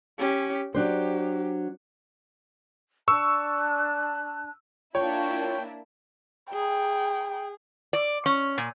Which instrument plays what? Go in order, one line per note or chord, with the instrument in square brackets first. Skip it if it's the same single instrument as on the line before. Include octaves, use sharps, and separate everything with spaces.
[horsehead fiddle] C#4 G4
[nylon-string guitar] F#3 D4 C5 [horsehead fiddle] G4
[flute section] D4 A5 F#6 [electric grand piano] C#6 E6
[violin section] A#3 D4 E4 [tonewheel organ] F4 [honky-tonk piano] C#5 [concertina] G5
[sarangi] G#4 [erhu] G5
[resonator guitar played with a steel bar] D5
C#4
A#2